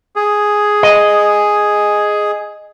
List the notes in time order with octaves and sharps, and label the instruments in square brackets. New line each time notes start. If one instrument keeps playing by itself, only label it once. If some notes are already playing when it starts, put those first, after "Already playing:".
[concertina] G#4
[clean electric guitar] D#5